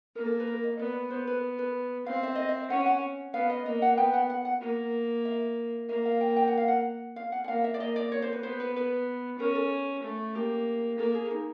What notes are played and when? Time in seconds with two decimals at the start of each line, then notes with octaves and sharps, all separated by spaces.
0.16 A#3 A#4
0.26 A4
0.40 B4
0.47 A#4
0.63 D#5
0.79 B3 D5
1.11 B3 C5
1.27 B4
1.59 B4
2.06 C4 F5
2.23 E5
2.35 D#5
2.49 E5
2.70 C#4 F#5
2.86 F#5
3.34 B3 F5
3.50 D#5
3.66 A#3 D#5
3.82 F#5
3.97 B3 G5
4.14 F#5
4.30 F#5
4.45 F#5
4.61 A#3
5.25 E5
5.89 A#3 E5
6.05 F5
6.21 G5
6.36 G5
6.48 F#5
6.57 F5
6.68 F#5
7.16 F5
7.32 F#5
7.44 F#5
7.48 A#3 F5
7.64 E5
7.74 D5
7.80 A#3 D#5
7.96 D5
8.12 C#5
8.22 C5
8.33 B4
8.43 B3 C5
8.60 B4
8.76 B4
9.39 C#4 A#4
9.55 A4
10.03 A3
10.35 A#3 G4
10.98 A#3 A4
11.15 G#4
11.31 D#4